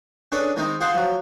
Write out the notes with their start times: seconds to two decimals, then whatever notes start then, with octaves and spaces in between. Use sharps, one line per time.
0.32 C#4 D4 G#4 A4 B4
0.57 D#3 G#3 C4 D#4
0.81 F4 G#4 C5 F#5 C6
0.94 F3 F#3